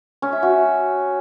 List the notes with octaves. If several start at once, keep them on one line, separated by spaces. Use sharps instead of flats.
C#4
E5
F#4